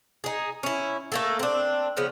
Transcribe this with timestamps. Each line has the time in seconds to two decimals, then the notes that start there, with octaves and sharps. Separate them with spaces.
0.24 D#4 G#4
0.63 C#4 E4
1.12 A3 A#3 A4
1.39 C4 D4
1.97 C#3 F3 B3